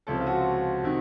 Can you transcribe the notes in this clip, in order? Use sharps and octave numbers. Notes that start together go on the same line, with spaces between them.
C#2 C3 F3 A4
F4
F#4
C3 D#3